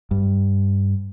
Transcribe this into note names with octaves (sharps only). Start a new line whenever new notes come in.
G2